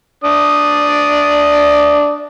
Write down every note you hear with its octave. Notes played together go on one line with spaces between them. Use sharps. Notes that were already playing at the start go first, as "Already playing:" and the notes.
D4 D5 D#6